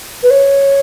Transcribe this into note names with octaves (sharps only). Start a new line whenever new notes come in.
B4
C#5